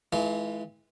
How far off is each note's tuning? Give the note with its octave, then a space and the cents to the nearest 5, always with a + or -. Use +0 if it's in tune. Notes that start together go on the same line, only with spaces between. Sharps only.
E3 -25 G#3 +35 F4 -40